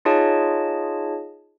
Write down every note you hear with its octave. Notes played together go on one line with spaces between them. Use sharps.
D#4 F4 G#4 C#5 D#5 A5